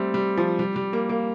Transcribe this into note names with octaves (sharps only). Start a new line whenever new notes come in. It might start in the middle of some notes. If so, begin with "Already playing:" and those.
Already playing: G3 A3 C4
G3
F3
G3
G3
A#3
A#3